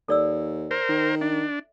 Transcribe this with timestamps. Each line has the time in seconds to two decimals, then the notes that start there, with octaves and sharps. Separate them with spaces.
0.08 D#2 A4 D5 E6
0.71 A#4 C5
0.89 D#3
1.21 D4 E5